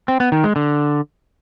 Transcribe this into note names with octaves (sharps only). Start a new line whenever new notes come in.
C4
B3
D#3
G#3
D3